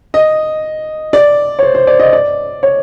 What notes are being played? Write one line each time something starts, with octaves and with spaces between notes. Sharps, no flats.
D#5
D5
C#5
C5
C5
D5
D#5
D5
C#5